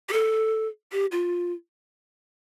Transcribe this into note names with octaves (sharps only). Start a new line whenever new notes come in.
G4
A4
G4
F4